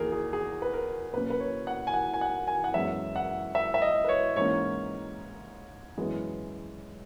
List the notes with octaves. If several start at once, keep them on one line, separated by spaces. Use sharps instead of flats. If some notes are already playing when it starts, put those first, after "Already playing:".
Already playing: E2 D#3 A#3 G#4 A#4
G#4
G#4
B4
A#4
B2 F#3 A#3 C#4 B4
B4
C#5
F#5
G#5
F#5
G#5
F#5
G#5
F#5
F#2 E3 G#3 B3 E5
F#5
E5
E5
D#5
B4
C#5
G#2 E3 A#3 C#4 C#5
F#2 E3 G#3 B3